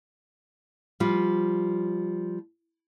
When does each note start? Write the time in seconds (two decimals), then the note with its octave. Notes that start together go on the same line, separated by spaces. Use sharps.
1.00 F3 G3 F4